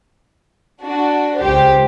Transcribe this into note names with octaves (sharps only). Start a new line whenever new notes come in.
D4 F#4
C#2 G4 C5